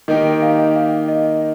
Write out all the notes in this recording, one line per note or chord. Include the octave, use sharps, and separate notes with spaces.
D#3 A#3 D#4 G4 D#5
F5
D#5
F5
D#5